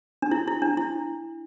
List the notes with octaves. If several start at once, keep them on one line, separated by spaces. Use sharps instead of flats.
D4
E4
E4
D4
E4